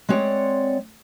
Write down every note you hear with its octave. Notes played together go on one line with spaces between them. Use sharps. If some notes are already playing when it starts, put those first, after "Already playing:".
G#3 C4 C#5 D5 F#5